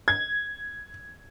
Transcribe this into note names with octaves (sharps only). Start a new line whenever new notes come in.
G#6